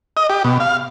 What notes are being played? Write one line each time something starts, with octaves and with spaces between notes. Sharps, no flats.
D#5
G4
B2
F5